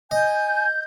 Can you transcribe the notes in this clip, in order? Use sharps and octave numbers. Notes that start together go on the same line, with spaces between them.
D#5 G#5 G6